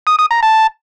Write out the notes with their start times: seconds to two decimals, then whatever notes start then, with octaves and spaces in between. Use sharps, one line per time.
0.07 D#6
0.19 D#6
0.31 A#5
0.43 A5